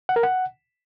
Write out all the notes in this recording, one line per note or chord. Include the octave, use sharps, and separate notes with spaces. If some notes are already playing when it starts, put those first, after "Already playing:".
F#5
A#4
F#5